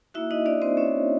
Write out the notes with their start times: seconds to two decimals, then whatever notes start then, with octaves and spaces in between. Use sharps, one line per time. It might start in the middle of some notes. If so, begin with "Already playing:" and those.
0.14 A#3 D#4 E4 F#4 E5
0.31 D#4 D#5
0.46 D4 D5
0.62 C4 C5
0.77 C#4 C#5